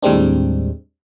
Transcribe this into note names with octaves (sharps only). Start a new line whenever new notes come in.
D#2 A2 G3 G#3 C4 D4